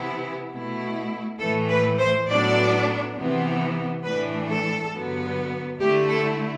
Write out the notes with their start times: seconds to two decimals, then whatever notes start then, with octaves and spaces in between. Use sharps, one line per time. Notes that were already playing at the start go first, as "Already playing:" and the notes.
Already playing: C3 E3 B3 E4
0.52 B2 A3 E4
1.39 A2 E3 A3 A4
1.69 B4
1.98 C5
2.28 A2 F#3 B3 D4 D5
3.16 C3 E3 B3
4.03 A2 E3 A3 D4 B4
4.48 A4
4.92 G2 D3 F#3 B3
5.80 D3 A3 E4 G4
6.09 A4